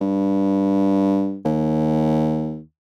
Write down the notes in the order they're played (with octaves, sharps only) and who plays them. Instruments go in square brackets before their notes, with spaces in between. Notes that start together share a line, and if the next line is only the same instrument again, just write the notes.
[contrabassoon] G2
D#2